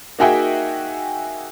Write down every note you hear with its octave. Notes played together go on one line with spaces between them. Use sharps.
A#3 D#4 F#4 G#4 E5 G5